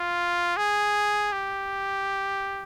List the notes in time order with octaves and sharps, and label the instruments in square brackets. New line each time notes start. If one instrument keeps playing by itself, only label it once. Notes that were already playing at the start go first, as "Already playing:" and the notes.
Already playing: [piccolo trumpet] F4
G#4
G4